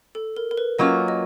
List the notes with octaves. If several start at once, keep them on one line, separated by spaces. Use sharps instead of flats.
A4
A#4
A#4
B4
F#3 A#3 C#4 F4 D#5
D#5